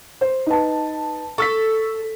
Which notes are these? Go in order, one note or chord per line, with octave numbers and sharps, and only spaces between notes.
C5
D#4 B4 A5
A4 C#6 E6 B6